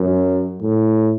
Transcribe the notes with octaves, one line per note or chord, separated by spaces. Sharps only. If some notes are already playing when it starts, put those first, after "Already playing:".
Already playing: F#2
A2